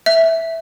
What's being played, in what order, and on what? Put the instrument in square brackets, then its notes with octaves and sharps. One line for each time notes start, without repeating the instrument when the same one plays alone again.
[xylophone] E5